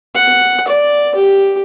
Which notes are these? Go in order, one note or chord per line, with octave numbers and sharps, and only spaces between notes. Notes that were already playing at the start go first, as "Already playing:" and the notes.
F#5
D5
G4